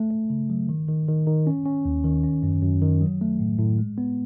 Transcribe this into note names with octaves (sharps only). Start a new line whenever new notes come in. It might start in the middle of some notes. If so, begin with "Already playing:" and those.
Already playing: A3
A3
C#3
F#3
D#3
D#3
D#3
D#3
C#4
C#4
D#2
D#3
C#4
F#2
F#2
D#3
F#3
A3
A2
A2
G#3
B3